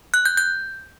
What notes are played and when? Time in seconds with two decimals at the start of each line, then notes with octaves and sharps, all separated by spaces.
0.14 F#6
0.26 G6
0.37 G6